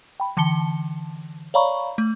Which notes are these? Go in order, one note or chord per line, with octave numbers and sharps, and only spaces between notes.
G5 B5
D3 E3 A5 C#7 G7
C#5 D5 F5 A#5 B5 C#6
A3